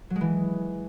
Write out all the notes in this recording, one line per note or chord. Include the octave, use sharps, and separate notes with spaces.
F#3
G#3
E3